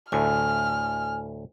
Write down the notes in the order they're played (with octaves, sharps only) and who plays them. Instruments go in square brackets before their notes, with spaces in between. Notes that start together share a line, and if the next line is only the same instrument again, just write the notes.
[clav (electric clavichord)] D2 A2 [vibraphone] G#5 [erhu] F6